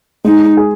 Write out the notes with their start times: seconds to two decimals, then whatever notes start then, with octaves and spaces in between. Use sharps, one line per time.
0.24 G#3 D#4
0.57 G#4